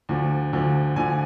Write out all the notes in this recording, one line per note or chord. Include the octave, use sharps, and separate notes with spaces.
D2 D3 F3
D2 D3 F3
D2 D3 F3 G#5